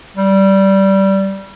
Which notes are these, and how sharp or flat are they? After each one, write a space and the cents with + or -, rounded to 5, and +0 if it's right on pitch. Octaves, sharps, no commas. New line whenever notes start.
G3 -15